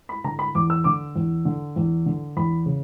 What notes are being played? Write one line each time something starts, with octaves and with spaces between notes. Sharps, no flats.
B5
D3 A#5
B5
E2 D6
E6
D3 D6
E2
D3
E2
D3
E2 B5
C#3